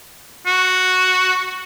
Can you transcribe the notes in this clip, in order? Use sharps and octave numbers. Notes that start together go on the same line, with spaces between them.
F#4